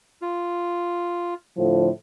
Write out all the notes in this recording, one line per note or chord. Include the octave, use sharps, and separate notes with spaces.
F4
A2 D3 F3